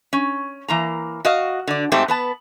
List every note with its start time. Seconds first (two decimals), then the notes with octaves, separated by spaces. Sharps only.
0.13 C#4
0.68 E3 A#3 A#5
1.25 F#4 D#5 F5
1.67 D3 D5
1.92 G#2 A3 C4 G4 A4
2.08 B3 B4 A5